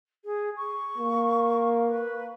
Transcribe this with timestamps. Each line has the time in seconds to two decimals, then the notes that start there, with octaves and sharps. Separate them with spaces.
0.25 G#4
0.57 C#6
0.98 A#3
1.88 B4